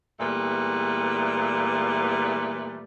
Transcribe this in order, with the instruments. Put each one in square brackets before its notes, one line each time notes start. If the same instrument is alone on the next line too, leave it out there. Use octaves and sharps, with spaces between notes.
[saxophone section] E2 A#2 G3 A3 B4